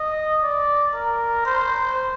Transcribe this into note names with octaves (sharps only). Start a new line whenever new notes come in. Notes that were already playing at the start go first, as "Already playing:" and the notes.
Already playing: D#5
D5
A#4
C5